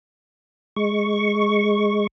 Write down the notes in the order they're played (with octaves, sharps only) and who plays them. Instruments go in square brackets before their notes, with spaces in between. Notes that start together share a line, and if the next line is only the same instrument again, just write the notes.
[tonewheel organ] G#3 C#6